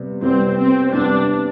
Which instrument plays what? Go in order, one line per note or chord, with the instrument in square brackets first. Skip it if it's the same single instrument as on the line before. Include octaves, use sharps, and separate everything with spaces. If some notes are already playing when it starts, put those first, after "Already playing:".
Already playing: [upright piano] C3 G3 B3
[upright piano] C3 G3 B3 [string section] C4
[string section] C4
[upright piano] C3 G3 B3 [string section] D4